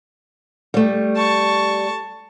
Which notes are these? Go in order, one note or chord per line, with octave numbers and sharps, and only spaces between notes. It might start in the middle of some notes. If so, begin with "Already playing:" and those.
G3 A3
A5 C#6